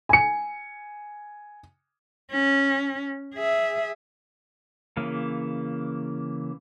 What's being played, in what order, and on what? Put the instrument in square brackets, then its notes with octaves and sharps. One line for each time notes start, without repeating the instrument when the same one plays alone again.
[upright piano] G#5 C#7
[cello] C#4
G#4 E5
[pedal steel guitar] C#3 E3 A#3